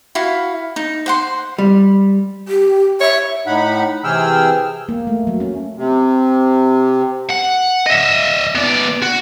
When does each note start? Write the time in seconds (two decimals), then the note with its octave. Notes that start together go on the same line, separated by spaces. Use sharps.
0.15 E4 F#4 F5
0.76 D#4
1.06 C5 F#5 C6
1.58 G3
2.48 G4
3.01 C#5 E5
3.46 A2 D#4 F#5 B5
4.04 C3 E3 G#4 G5 E6 F6
4.89 A#3
5.07 A3
5.27 F#3
5.40 C#4
5.77 C3
7.30 F#5
7.86 D#5 E5
8.55 B3 D5
9.03 F#4